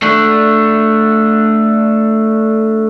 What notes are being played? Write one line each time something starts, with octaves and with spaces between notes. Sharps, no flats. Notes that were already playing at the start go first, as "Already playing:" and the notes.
A3 D4